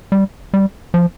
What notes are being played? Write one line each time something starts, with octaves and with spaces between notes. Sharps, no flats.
G3
G3
F3